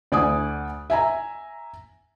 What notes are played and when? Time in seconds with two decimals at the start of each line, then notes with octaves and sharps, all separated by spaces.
0.12 D2 D5 G#5 D#6
0.90 E5 G#5 A#5